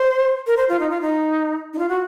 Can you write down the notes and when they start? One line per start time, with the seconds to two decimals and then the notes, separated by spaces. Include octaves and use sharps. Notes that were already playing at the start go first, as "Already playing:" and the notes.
Already playing: C5
0.47 A#4
0.57 C5
0.69 F4
0.80 D#4
0.90 F4
1.01 D#4
1.73 D#4
1.79 F4
1.89 F#4